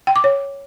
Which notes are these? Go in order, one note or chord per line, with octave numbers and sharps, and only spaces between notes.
G5
D6
C#5